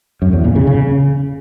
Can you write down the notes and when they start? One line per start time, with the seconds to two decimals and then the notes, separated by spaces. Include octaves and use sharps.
0.22 F#2
0.33 E2
0.44 A#2
0.56 C#3
0.67 C#3